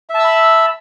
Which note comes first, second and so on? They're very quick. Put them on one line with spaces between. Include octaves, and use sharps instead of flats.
E5 A5 E6 B5